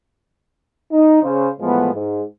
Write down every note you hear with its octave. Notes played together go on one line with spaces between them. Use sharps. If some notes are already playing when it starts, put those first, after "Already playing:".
D#4
C#3 C5
A2 E3 F3 G#3 B3
G#2